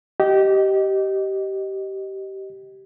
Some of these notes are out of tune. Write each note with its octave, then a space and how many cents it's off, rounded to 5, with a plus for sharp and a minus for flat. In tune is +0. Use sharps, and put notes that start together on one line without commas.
G4 -20 D#5 +0